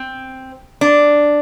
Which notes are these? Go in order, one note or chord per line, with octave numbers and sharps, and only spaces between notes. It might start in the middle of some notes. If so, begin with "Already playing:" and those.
Already playing: C4
D4